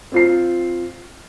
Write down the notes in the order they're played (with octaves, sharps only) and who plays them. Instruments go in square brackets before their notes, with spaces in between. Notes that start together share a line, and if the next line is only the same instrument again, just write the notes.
[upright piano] C4 F4 C7